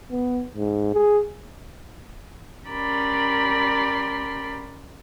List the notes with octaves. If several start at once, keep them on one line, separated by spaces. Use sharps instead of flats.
B3
G#2
G#4
C#4 G4 A#4 D5 B5 C6